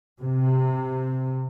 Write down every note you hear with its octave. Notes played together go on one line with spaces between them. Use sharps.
C3